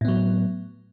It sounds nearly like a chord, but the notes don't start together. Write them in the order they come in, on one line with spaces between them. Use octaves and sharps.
A2 B3 F#3